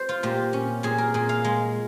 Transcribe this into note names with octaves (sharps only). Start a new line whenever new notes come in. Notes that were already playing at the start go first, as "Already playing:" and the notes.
Already playing: C5
F4
A#2 G4
C#4
A#2 G#4
A#4
A#2 G#4
F5
G#3